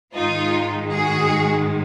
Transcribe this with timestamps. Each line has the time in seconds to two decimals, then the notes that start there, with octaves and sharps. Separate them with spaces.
0.15 G#2 D#3 G#3 D#4 F4
0.95 F#4 G#4